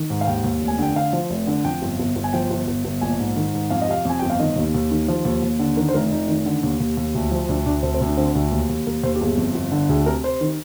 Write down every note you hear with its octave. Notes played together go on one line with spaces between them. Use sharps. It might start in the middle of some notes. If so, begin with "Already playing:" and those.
Already playing: D#3
G#2
F5
D#2 G5
D#2
F1
G#5
D3 G5
D3 F5
F3
F1
D3
F2 G5
G1
G1
G1
G#5
F3 G5
G1
G1
G1
A#1 G#5
G#2
D#3
G#2
F2 F5
D#5
C3 F5
F2 G#5
G1 G5
F5
D#3 D#5
D#2
D#2
D#3
F3
D#2
D#2
D3
D#3 A#4
C5
F1 A#4
F1 D#4
D#3
D3
D#2
D#2
D#2
D2
F3
D2 D4
D2 D4
D2 C4
C4
D2
D4
D3 C4
D2
D#2
D#2
D#2 A#4
D#2 C5
G4
G1 G#4
F2
G1
D3
D2 G#4
C3 A#4
C3 C5
D#3